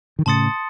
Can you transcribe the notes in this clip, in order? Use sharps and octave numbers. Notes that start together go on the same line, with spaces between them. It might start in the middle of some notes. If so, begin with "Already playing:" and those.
D#3
A2 C#3 A5 C6 D#6 A6 C#7